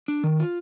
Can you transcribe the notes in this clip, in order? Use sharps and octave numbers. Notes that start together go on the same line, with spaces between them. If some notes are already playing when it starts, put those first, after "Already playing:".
D4
D#3
F4